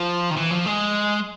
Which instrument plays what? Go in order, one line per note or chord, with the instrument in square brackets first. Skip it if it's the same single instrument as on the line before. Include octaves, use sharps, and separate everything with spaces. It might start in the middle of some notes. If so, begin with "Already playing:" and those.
Already playing: [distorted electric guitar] F3
D#3
E3
F3
G#3